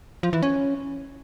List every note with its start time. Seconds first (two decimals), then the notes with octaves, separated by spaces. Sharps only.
0.23 F3
0.33 E3
0.43 C#4